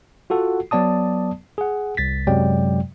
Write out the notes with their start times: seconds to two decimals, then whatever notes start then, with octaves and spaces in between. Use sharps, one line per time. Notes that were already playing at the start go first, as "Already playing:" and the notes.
0.30 F4 F#4 A4 F#5
0.71 F#3 B3 D5 A5 D#6
1.58 G#4 F#5
1.97 C2 A6 B6
2.27 F#2 C3 F#3 G#3 D5 G5